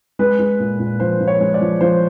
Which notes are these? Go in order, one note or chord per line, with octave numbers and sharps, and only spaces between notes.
G#3 B4
G#3
A#2
A#2
F3 C5
F3
C#5
G#3
D5
F3
F3 C5